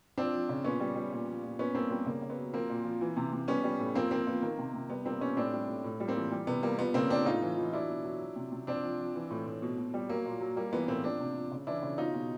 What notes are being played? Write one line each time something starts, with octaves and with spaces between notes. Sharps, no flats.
F3 C4 D4
F3
C#3
A#2 B3 C#4
G3
G3
A#2
F3
A#2
A#2 B3 C#4
G3 A#3 C4
G3 B3
C#3 A#3
C#3
B3
F#3
F3 A#3 C4
A#2
F3
E3
C3
C3
G3 B3 C#4
G3
A2
F3 A#3 C4
F3 A#3 C4
F3 B3
D#3 A#3
C3
C3
G3 B3
G3 A#3 C4
G3 B3 C#4
A2 C4 D4
G3
A2
A2
G3
A#3 C4
E3
G3
C3 B3
G3 A#3
F3 B3
C#3 A#3 C4
F3 C4 D4
A2 D#4 F4
E3
E3
F#3 D4 E4
B2
F#3
F#3
C3
C3
F3 C4 D4
F3
F3
E3
A2
A2
B2
B2
G3
F#3 A#3
A#2
F#3
G3 A#3
E3 B3
A2 A#3 C4
F3 C4 D4
C3
F3
C#3
E3 D4 E4
C#3
B2 D#4 F4
B2